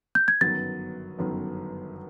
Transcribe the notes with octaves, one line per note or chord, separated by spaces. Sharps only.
G6
G#6
G1 F#2 D#3 F#3 B3 A6
G1 F#2 D#3 F#3 B3